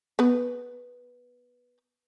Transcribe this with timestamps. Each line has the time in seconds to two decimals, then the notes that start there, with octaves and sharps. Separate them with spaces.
0.19 B3 B4